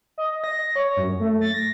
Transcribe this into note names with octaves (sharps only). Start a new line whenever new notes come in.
D#5
A#6
C#5
F#2
A3
A6
A#6